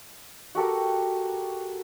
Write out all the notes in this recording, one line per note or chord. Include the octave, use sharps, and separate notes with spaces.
F#4 G4 A4 A#4